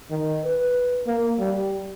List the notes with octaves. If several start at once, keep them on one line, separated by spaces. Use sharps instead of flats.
D#3
B4
A#3
G3